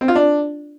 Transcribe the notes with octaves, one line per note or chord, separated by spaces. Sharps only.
C4
F4
D4